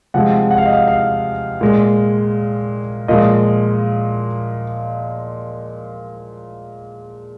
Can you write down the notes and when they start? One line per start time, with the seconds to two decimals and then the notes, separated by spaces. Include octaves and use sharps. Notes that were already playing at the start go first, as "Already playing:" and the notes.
0.14 C3 F3 G#3 F#5
0.51 F#5
0.58 F5
0.66 D#5
0.73 F5
0.88 F5
1.61 A#2 G#3
3.08 A#2 F3 G#3 D#5